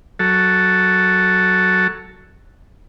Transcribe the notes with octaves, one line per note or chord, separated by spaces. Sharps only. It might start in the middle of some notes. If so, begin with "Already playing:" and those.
F#3 A4